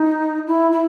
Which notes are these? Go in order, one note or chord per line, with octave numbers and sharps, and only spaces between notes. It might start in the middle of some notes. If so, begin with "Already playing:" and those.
Already playing: D#4
E4
E4